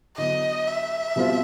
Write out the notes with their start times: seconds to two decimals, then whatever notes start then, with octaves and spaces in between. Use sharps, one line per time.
0.17 D3 F#3 B3 E4 D#5
0.67 E5
1.16 B2 G3 C4 F4